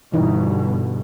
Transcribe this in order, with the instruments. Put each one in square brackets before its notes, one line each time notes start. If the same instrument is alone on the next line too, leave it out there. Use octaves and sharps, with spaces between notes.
[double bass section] G1 B2 [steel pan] E3 D#4